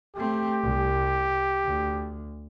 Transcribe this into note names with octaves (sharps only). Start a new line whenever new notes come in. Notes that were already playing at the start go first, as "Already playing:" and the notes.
A3 C4 G4
C2
D2